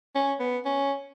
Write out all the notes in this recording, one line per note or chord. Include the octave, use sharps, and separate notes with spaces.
C#4
B3
C#4